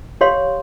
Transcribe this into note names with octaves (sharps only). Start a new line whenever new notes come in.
G4 C#5 F5 C6